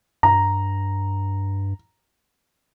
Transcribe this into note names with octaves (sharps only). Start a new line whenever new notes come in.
G2 A#5